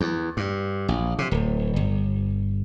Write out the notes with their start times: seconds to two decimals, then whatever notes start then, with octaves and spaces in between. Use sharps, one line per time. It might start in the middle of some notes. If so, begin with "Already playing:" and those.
0.01 E2
0.37 G2
0.88 A#1
1.19 C3
1.31 D1
1.76 G1